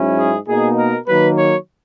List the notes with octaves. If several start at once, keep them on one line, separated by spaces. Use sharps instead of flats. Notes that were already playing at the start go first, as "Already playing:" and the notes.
Already playing: G#2 F#3 C#4 E4
G#4
B2 A#3 D#4 G#4
A#4
D#3 F#3 A#3 B4
C#5